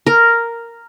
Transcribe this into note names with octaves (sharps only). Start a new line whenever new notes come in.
A#4